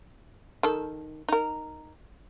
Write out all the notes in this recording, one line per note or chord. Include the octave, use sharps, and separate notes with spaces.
D#3 A4
D#4 A#4